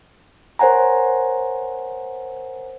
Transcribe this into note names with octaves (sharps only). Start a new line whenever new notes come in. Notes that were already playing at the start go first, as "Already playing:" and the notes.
A#4 C5 C#5 F#5 G#5 A#5